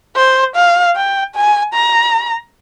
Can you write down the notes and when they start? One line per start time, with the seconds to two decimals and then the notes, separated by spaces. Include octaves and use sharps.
0.16 C5
0.55 F5
0.96 G5
1.35 G#5
1.74 A#5